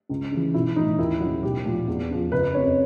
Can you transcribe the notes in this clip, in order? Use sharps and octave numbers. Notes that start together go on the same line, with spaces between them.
C#2
C#3 E3
B1 E4
A2 E3 D#4
D#2 E4
C#3 F#3
B1 G4
A#2 F3
E2
C#3 F3
F#1 B4
F2 C#3 C#5